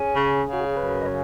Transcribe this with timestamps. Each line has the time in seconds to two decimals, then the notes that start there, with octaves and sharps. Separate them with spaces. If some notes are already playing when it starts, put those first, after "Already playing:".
Already playing: C#4 G#4
0.16 C#3
0.46 C#3
0.53 F#4
0.64 G#4
0.77 F#2 B4
1.02 D#5
1.06 C#3 C#5